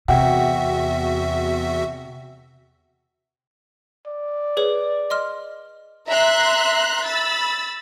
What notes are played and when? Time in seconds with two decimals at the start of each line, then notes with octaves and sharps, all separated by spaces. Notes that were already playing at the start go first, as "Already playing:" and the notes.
0.08 E2 C3 F#4 E5 F#5 G5
4.07 D5
4.57 G#4 B4 C#5
5.10 D#5 C6 F6
6.08 E5 A#5 C6 F#6
7.05 B5 E6 A6